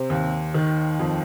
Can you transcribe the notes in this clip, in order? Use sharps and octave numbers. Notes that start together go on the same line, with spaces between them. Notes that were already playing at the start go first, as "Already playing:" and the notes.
Already playing: C3 C5
D#2
D#3
F2